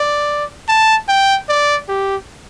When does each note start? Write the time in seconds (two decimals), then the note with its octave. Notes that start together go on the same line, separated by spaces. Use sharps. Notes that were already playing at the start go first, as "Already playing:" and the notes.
Already playing: D5
0.69 A5
1.09 G5
1.49 D5
1.88 G4